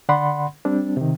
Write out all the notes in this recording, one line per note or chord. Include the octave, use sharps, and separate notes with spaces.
D3 D5 F#5 B5 C6
G3 C4 D4
C3 D#3